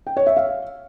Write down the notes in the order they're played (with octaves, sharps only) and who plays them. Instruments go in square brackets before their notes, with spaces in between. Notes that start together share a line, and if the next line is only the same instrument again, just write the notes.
[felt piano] G5
C#5
E5
F5